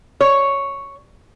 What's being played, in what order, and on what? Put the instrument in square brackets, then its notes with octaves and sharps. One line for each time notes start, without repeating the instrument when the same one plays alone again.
[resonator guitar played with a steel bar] C#5